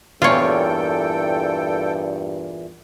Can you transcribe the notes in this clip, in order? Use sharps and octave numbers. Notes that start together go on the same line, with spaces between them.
E2 G2 A#2 F4 A4 C#5 G5